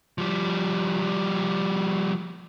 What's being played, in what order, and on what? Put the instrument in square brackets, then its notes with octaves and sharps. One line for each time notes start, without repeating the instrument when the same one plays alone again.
[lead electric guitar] F3 G3